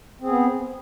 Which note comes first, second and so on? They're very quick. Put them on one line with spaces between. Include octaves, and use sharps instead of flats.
C4 G#4 B3